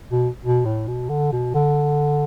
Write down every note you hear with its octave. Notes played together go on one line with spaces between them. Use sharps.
B2
B2
A2
B2
D3
B2
D3